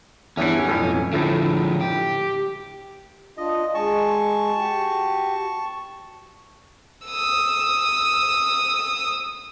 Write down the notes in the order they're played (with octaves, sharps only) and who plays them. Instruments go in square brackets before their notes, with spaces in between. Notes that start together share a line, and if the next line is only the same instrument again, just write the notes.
[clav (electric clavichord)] E2 G2 E3 [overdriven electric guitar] C#4
[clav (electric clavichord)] B1 F2 A2
[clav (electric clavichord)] A2 A3 [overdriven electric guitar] D3 F3
[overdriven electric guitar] G4
[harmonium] D4 F4 [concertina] D#5
[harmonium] G#3 G#5 [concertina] A5 C#6
[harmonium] F#4 G4
[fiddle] D#6 E6